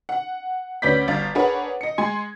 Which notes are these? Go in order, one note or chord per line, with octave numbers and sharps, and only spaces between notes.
F#5
D2 C#4 B4 D5 G6 B6
G1 F5 A6
D4 G#4 A#4 B4 C#5 F#5
D#5 C#7
G#3 G#5 C6 G#6